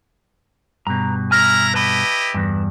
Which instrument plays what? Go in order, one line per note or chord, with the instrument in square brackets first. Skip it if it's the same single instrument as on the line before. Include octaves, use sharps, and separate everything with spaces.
[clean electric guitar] G2 B2 [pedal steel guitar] A#5
[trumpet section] E4 A#5 [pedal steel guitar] G#5 F6
[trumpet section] E4 G4 D#5 [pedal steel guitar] B4 A5 B5
[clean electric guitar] E2 G2